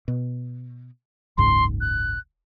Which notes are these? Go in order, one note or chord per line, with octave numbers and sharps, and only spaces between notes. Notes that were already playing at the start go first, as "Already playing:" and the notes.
B2
F#1 C#2 G#2 C6
F#6